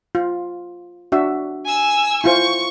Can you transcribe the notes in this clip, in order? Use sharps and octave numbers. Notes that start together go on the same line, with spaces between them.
F4
D4 F#4 E5
G#5 E6
E4 F4 C5 C#6